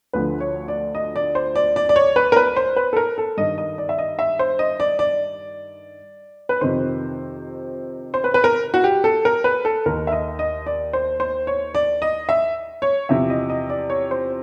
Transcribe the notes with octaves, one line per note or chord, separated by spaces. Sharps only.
D2 D3 F3 B4
C#5
D5
D#5
D5
C5
D5
D5
D5
C#5
B4
A#4
B4
C5
B4
A4
A#4
A4
G2 D#3 D#5
D#5
D5
E5
D#5
E5
C5
D#5
D5
D5
B4
F2 C3 D#3 C5
C5
B4
B4
A#4
F#4
G4
A4
A#4
B4
A4
D#2 D#3 A#4
E5
D#5
D#5
D5
C5
C5
C#5
D5
D#5
E5
C#5
E2 C3 F3 E5
D#5
D#5
D5
C#5
C5